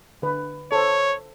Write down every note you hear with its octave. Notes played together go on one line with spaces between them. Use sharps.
D3 B4
A4 C5 C#5